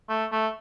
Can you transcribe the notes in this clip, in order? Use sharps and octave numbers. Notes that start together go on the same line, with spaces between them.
A3
A3